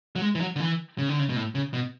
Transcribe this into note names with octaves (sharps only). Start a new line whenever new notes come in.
F#3
G#3
E3
F#3
D3
E3
C#3
D3
C#3
B2
A2
C#3
B2